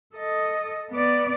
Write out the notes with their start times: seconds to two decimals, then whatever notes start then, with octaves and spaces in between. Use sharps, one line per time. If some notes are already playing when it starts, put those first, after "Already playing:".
0.15 A4 D#5
0.91 B3 D5